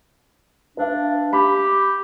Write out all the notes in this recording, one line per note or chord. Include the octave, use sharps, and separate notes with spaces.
D4 B4 E5 F5
G4 B5